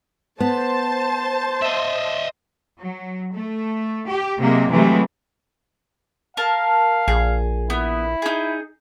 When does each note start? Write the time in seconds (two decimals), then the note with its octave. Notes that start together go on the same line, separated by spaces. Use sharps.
0.40 B3 C5 A5
1.62 D#5 E5
2.80 F#3
3.33 A3
4.08 G4
4.38 C3 F#3 G#3 A#3
4.70 C3 E3 F#3 G#3 A3
6.37 A#4 F5 A5
7.08 A#1 G#4
7.70 B3 E4
8.22 D#4 G#4